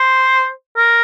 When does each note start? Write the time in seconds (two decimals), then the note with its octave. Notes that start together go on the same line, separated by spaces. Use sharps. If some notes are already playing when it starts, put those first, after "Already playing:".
Already playing: C5
0.77 A#4